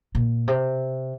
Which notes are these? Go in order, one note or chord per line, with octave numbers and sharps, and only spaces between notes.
A#2
C3